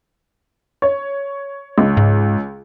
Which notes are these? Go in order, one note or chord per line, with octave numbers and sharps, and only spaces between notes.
C#5
C#2
G#2